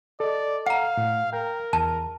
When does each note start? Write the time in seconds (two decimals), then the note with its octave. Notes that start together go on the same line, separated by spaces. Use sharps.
0.20 A4 D5 D#5
0.66 F5 F#5 A#5
0.97 A2
1.33 A#4 G5
1.73 E2 A5